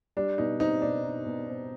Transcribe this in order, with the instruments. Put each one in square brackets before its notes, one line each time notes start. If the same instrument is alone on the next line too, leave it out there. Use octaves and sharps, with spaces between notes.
[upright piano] G3 [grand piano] D4
[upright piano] B2 [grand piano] D#4
[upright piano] C4 [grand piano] D#4
[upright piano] B2 [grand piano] D4
[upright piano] D#4
B2
C4